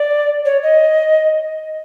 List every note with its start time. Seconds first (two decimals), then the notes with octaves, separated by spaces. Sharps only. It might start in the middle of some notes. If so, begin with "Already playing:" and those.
Already playing: D5
0.45 C#5
0.63 D#5